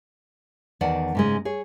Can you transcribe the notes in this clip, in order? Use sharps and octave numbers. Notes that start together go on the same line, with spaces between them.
E2 D#3 D5 F#5 A5
G#2 C#3 G#3
G#4 C#5